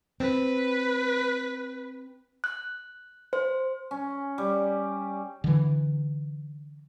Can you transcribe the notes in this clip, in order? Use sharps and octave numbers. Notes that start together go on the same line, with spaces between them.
C4 B4
F#6
C5
C#4
G3
D3 E3